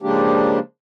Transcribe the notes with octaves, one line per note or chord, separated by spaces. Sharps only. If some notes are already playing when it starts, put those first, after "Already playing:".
C#3 F3 G#3 A#3 D4 G4